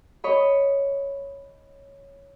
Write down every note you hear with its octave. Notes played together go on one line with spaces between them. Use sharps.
C#5 D#5 B5